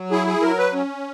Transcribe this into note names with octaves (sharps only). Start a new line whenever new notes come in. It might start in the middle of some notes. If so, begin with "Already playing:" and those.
Already playing: F#3
E4 G#4
G#4
F#3 A#4
B4
C#4